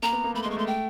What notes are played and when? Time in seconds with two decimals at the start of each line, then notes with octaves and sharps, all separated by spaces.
0.02 A#3 A#5
0.13 B3
0.24 A#3
0.34 A3 B5
0.43 C6
0.45 G#3
0.51 C#6
0.57 A3 C6
0.67 G5